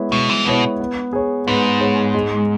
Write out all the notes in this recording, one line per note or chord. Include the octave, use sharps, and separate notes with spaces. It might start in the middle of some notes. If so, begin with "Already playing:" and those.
Already playing: G#3 B3 E4 C#5
B2 G#3
E3
B2 B3 E4 C#5
B3
G#4 C#5
G#2 B3
G#4 C#5
G#3